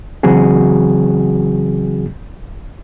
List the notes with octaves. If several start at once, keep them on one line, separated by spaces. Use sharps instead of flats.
C#3 E3 F#3 C4 F#4 G#4